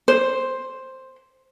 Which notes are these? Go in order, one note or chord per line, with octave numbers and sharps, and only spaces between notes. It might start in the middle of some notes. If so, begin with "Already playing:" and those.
C5